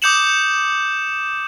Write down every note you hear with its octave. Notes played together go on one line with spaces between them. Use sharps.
D6 D#6 G6 C#7 E7 F#7